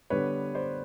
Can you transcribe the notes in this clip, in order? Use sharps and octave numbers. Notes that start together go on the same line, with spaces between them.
D3 G3 B3 B4 C#5
C5 D5